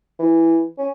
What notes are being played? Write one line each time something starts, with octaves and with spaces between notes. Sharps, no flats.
E3
C#4